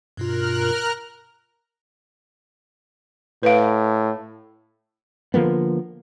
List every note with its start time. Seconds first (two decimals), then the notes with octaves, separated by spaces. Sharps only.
0.17 G2 B2 F4 A#4 F6 F#6
3.43 A2 B4 F5
5.34 D3 F3 A#3 B3